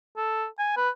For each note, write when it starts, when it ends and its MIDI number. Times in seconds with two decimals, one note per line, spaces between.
0.17 0.46 69
0.59 0.73 80
0.76 0.89 71